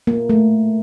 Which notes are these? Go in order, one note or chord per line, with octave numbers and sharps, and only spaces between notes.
A#3
A3